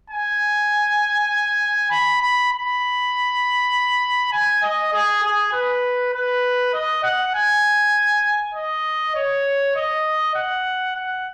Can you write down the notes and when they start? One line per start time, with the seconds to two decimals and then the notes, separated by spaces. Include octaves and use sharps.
0.10 G#5
1.90 B5
2.21 B5
2.52 B5
4.32 G#5
4.62 D#5
4.93 G#4
5.23 G#4
5.53 B4
6.13 B4
6.73 D#5
7.03 F#5
7.34 G#5
8.54 D#5
9.15 C#5
9.76 D#5
10.35 F#5
10.96 F#5